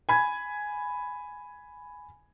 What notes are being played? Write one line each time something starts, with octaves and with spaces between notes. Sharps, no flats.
G#5 B5 G#6